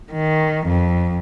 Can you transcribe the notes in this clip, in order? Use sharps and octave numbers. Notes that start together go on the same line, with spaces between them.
D#3
F2